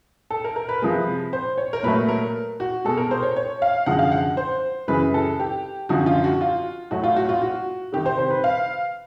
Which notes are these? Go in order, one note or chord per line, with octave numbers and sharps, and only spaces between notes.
A4
A#4
A#4
B4
C3 F3 G#3
C5
C#5
A#4
A#2 F#3 A3 B4
A#4
F#4
B2 G#3 A4
A#4
C5
C#5
C#5
F5
F#2 D3 F3 G#3 F#5
F5
F#5
C5
F#2 C#3 E3 G#3 B4
A4
G4
F#2 D3 F3 F#4
F4
F#4
F4
A2 F#3 A3 F#4
F4
F#4
F4
F#4
C3 D#3 G3 G4
C5
C5
B4
F5